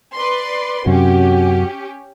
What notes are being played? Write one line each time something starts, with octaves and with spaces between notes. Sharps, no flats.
B4 D5 C6
F#2 C3 C#4 F#4 G4